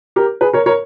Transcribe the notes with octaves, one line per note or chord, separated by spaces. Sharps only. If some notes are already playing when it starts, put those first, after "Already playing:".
G4 A#4
G#4 B4
A#4 C#5
A#4 C#5